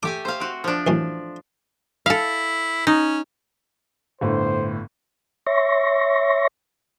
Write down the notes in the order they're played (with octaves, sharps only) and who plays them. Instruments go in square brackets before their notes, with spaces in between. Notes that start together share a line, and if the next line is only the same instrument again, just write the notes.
[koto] A3 G4 G#5 [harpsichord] D6
[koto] C5 F5
C4 F#4
F3 D4
[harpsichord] A1 F#2 A2
[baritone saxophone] E4 [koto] A4 F5
[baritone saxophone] C#4 [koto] D#4
[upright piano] G1 A2 D3 [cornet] C5
[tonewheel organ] C#5 E5 C6 C#6 A#6